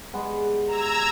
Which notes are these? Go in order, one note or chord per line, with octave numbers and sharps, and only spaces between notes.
G3 G#3 B3
A#5 E6 G#6